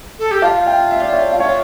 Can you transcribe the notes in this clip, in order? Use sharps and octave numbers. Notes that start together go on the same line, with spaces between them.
A4
G4
F4 F5 A5
E5 G5
E5
D5
C#5 E5
F5
F4 C#5 E5